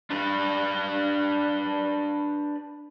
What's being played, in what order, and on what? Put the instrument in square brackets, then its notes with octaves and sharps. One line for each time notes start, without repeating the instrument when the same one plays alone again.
[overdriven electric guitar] D4 B4